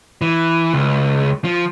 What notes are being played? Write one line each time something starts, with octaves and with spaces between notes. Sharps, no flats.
E3
C#2
F3